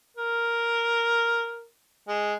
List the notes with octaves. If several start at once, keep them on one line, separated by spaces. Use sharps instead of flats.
A#4
G#3